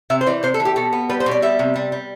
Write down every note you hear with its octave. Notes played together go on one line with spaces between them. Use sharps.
C3 E5
C5
E3 D5
C3 C5
A4
E3
G4
B2 A4
B3
G3 B4
C5
B2
D5
G3 E5
C3
G3
G3